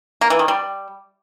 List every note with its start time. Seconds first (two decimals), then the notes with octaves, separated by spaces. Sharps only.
0.21 A#3
0.30 E3
0.39 D#3
0.48 G3